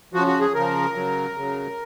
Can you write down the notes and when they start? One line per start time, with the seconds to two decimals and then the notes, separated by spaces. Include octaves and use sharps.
0.13 C#3 F3 F#4
0.27 F#4
0.41 G#4
0.54 C#3 F3 A#4
0.95 C#3 F#3
1.35 C#3 F#3